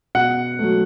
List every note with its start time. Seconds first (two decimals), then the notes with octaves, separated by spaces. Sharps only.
0.15 B2 F#5
0.59 F#3 A3